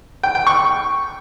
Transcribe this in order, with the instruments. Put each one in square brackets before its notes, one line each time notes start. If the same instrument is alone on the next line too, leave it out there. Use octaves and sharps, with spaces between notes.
[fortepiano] G5
G5
C#6